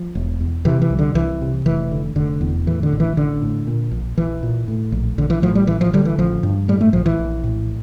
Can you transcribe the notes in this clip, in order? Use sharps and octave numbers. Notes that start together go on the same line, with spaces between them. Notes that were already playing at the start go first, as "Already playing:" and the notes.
Already playing: F3
E1
E2
C3 E3
E3
C2
D3
C2 E3
C3
F1 E3
D3
F1 D3
E2
A2 E3
D3
A1
E3
A1 D3
A2
A#2
A#1
A#1 E3
A#2
A2
A#1
A#1 D3
E3
A2 F3
G3
A1 E3
F3
D3 G3
E3
A1 F3
G2
A2 G3
A3
A#1 F3
E3
A#1
A2